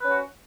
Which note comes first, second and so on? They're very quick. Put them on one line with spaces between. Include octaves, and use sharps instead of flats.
B4 C#4 F#4